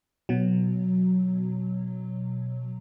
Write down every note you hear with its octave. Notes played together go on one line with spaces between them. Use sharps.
B2 F#3